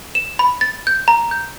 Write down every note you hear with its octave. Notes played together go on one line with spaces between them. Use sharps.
E7
B5
A6
G6
A#5
G6